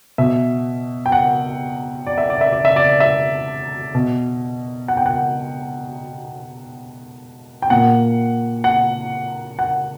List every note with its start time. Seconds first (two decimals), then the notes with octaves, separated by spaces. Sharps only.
0.18 B2 E5
1.06 G5
1.12 F#5
2.07 D5
2.18 E5
2.30 D5
2.41 E5
2.52 D5
2.65 E5
2.76 D5
3.00 E5
3.95 B2
4.88 F#5
4.97 G5
5.06 F#5
7.62 G5
7.70 A#2 F#5
8.64 F#5
9.59 F#5